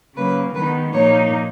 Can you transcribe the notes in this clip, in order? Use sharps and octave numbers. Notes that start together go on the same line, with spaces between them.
C#3 F#3 A#3 B4
D#3 G#3 B3 D#4 B4
A#2 F3 A#3 D#4 C#5